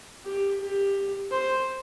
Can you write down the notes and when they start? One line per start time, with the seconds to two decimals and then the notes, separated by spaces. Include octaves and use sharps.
0.25 G4
0.60 G4
1.31 C5